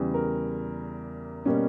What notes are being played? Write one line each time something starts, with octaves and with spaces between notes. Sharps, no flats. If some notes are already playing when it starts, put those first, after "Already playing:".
Already playing: E2 C#3 G3
A#4
B2 G3 A#3 C#4